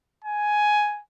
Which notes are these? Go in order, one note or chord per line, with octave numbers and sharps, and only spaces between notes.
G#5